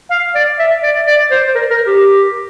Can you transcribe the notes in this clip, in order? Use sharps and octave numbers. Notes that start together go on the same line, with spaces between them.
F5
D5
E5
D5
D5
C5
A#4
A#4
G4